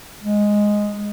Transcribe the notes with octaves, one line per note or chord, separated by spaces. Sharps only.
G#3